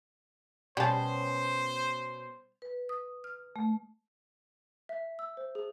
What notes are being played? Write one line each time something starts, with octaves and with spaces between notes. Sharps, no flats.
B2 G3 C#4 C5 A5
B4
D#6
F6
A3
E5
E6
C5
G#4